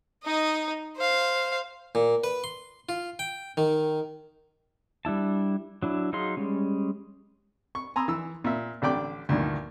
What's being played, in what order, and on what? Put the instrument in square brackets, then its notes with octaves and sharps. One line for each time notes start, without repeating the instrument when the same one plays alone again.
[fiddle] D#4 D#5
C5 F5
[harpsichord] A#2
B4
C6
F4
G5
D#3
[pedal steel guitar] G3 D4 E4 A5
F#3 D4 E4
F#3 D#4 G#4 F5 C6
G3 G#3 C#4
[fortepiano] C#6
G#5 A#5 C6 D#6 E6
E3 E6
A#2 E5
A1 D3 D5 G5 D6
D2 G2 A#2 D#3